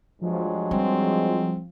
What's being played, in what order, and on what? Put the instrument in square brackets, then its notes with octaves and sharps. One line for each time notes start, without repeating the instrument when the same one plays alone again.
[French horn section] G2 F#3 G#3 [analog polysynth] F3
[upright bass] G3 [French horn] C4